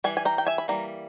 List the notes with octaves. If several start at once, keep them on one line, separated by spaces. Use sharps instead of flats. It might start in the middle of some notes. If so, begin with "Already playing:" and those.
E3 G3 G#5
G#5
G5 A#5
G5
E5 G#5
B5
E3 G3 A#3 A#5